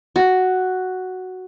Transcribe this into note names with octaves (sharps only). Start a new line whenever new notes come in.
F#4